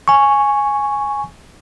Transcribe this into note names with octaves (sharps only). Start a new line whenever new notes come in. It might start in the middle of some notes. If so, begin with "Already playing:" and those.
G#5 C#6